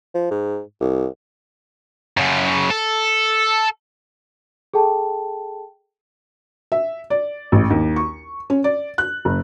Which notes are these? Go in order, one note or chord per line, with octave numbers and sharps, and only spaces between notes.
F3
G#2
C2
F#2 C#3
A4
G#4 A4 G5 A5
E5
D5
A1
D#2
C#6
C#4
D5
F#6
F#1